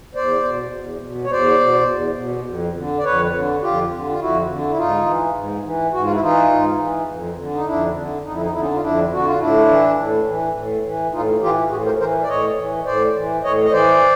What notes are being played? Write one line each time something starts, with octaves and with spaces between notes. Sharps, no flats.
E2 C5 D5
B2
E2
B2
C#5
E2 C5 D5
B2
E2
B2
F2
D3
D5
F2 B4 C#5
D3
F2 F4 G4
D3
F4
F2 E4 F#4
D3
E4
G#2 D#4 F4
E3
G#2
E3
G#2 F#4
F4
E4
E3 D#4 F4
G#2
E3
F2
D3
D#4
F2 D4 E4
D3
F2 D#4
E4
D#4
D3 E4
C#4 D#4
F4
F2 D4 E4
D3 F#4
F4
A2 D4 E4
E3
A2
E3
A2
E3
A2 D#4 F4
E3 F4 G4
A2 F#4 G#4
A#4 C5
E3 A#4 C5
D5
A2 C#5 D#5
E3
A2 C5 D5
E3
A2 C#5 D#5
D#5
E3 C5 D5